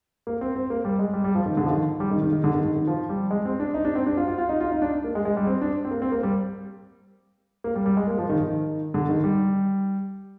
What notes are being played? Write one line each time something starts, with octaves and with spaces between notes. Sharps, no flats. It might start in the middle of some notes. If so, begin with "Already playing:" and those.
A#3
C4
C4
A#3
G3
G#3
G3
G3
F3
D#3
D3
F3
D#3
G3
D#3
D#3
D#3
D3
D#3
D#3
D#3
F3
G3
G#3
C4
D4
D#4
D4
C4
D4
F4
F4
F4
D#4
F4
D#4
D4
A#3
G#3
G#3
G3
C4
D4
C4
A#3
C4
A#3
G3
A#3
G3
G3
G#3
A#3
F3
D#3
D#3
D3
D#3
G3